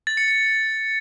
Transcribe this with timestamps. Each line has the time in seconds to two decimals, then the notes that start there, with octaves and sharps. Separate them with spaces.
0.07 A6
0.17 C#7
0.28 C#7